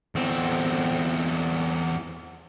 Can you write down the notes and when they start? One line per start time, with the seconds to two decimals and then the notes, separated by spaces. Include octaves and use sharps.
0.15 E2 C4